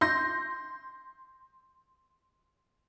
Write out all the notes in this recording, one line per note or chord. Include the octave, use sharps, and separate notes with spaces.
C6 G6 A#6